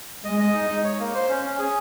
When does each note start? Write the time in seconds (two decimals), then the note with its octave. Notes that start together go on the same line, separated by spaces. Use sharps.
0.25 G#3 D#5
0.40 D#5
0.55 D#4
0.70 D#4
0.84 C#5
1.00 A#3
1.14 C5
1.29 C#4
1.44 C#4
1.59 G#4